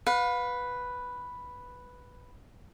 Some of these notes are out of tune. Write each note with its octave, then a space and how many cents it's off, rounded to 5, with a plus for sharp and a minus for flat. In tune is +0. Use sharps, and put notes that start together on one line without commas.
B4 +0 F5 +40